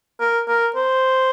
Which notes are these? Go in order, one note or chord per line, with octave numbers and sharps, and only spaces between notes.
A#4
A#4
C5